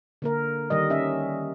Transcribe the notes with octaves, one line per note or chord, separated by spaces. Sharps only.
D3 A#3 A#4
D#3 G3 D#5
C#4 E5